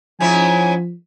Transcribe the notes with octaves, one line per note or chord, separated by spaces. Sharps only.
G#2 F3 C#4 E4 G#5